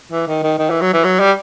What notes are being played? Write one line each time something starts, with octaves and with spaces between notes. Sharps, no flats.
E3
D#3
D#3
D#3
E3
F#3
E3
F#3
G3